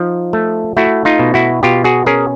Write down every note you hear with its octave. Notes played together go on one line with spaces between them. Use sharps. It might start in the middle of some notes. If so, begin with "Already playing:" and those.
Already playing: F3 D#4
A3
A3 E4 F#4
D#4 F4
B2
E4 F#4
B2 F4 G4
F#4 G#4
C#4 G#4 A#4